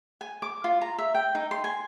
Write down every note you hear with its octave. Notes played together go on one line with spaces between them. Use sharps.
G#5
D6
F4
A#5
E5
G5
D#4
C6
G#5